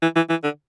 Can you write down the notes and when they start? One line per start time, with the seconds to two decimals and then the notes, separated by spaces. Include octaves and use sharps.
0.02 E3
0.16 E3
0.30 E3
0.44 D3